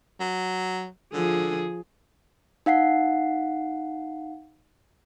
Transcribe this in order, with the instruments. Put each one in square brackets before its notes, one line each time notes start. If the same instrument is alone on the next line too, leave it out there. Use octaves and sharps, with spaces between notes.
[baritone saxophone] F#3
[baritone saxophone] D3 [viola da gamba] F3 G#4
[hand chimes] D#4 F5 F#5 C7